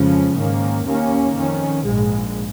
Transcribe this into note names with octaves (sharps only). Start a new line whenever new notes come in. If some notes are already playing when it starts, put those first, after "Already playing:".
Already playing: F2 C#3 F3 G#3 C#4
G#2 D#3 A#3 C#4
D#2 D#3 A#3 C#4
F2 D#3 C#4
A#1 G#2 G#3